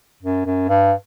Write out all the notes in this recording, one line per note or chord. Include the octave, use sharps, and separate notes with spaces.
F#2
F#2
G2